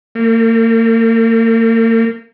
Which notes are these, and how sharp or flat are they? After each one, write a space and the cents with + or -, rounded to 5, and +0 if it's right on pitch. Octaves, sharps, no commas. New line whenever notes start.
A#3 -40